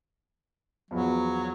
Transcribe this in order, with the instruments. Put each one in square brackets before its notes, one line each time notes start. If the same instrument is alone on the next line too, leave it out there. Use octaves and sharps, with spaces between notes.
[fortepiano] E2 F3 B3 [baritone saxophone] F#3